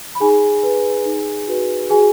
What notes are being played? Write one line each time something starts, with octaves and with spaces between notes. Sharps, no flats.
B5
D#4 G#4 G#5
B4
D#4
F#4 B4
F#4 G#4 G#5